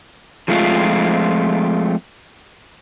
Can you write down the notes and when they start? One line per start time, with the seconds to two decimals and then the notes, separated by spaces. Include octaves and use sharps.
0.48 F3 G#3 A3 C4 F4